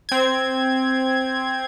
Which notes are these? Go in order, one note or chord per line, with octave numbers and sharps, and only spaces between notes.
C4 G#6